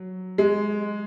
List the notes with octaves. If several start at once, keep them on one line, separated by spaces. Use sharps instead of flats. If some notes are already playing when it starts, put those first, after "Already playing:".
Already playing: F#3
G#3